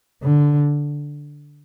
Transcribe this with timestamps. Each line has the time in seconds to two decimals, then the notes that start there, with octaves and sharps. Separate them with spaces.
0.23 D3